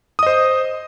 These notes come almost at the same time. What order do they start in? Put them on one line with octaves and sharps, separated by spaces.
D#6 D#5 C5